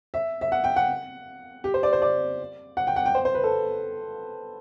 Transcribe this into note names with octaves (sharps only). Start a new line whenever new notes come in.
E5
E5
F#5
G5
F#5
G4
C5
D5
C5
D5
F#5
G5
F#5
G5
C5
C5
B4
A4